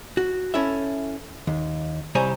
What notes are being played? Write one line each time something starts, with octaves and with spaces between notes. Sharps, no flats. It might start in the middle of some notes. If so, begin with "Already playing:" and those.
F#4
C#4 E4 A4 E5
D#2
C2 G3 C5 C#5 G#5 A#5